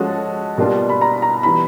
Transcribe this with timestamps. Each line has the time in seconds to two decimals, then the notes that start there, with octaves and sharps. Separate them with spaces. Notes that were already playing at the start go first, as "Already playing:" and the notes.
Already playing: F3 G#3 C#4 F#4 A4 A5
0.58 B2 G3 A#3 D4 F4
0.89 B5
1.01 A#5
1.22 A#5
1.43 E3 G3 B3 B5